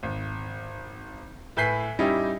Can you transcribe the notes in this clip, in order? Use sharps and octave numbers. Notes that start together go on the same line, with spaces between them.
G#1
A2 B4 G#5 G6 B6 C7
G3 C#4 D#4 E4 G4